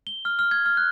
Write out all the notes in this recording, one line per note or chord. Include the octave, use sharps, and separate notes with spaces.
G7
F6
F6
G#6
F6
F#6